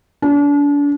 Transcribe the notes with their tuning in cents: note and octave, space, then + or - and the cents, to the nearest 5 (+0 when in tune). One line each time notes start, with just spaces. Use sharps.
D4 -35